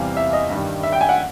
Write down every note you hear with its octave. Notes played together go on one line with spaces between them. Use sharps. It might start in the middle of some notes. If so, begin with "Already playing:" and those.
Already playing: E2 C3 E3 G3 F5
E5
D#5
G2 D#3 G3
E5
G5
G#5
F#5